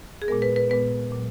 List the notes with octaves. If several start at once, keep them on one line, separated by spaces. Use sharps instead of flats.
G#4
A#2 G#3 B3 A#4
B4
B4
A#2 G#3 B3 B4
A#2 F#3